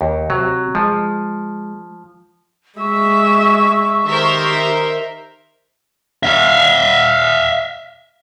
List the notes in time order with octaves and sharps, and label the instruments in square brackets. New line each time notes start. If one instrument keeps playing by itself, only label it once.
[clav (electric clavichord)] D#2
[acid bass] C3 [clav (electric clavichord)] F#3
[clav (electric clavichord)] F3 [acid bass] G#3
[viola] G#3 E5 [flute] C#6
[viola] D#3 G4 [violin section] A#4 C5 E5
[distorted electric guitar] E5 F5